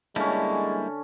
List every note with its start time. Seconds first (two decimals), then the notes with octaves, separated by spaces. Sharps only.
0.16 D3 G3 G#3 A#3 C#4 E4